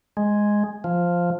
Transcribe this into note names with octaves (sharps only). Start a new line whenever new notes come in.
G#3
F3